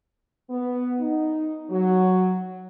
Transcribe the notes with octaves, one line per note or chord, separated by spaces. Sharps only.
B3
D#4
F#3